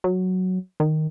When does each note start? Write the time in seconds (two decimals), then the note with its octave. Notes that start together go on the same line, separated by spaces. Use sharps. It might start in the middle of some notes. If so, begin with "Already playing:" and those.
0.04 F#3
0.80 D#3